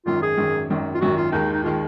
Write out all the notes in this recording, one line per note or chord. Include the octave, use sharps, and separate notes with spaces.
G#1 F#2 D#3 F4
G#4
G#1 F#2 D#3
G#1 F#2 D#3
F4
G#1 F#2 D#3 F#4
F4
D#2 D#3 G#3 D#4
D#4
D#3 G#3 F4